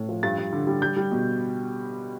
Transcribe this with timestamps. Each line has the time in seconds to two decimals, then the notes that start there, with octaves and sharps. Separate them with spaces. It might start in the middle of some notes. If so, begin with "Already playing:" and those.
Already playing: A2
0.09 F3
0.23 G2 A6
0.38 G2
0.53 D3
0.67 G3
0.82 G3 G6
0.97 G3
1.11 B2